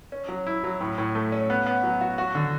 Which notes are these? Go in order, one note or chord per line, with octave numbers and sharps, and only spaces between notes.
C#4
F#3
E4
F#3
A2
A2
A3
C#4
B3
B3
F#3
F#4
F#4
D3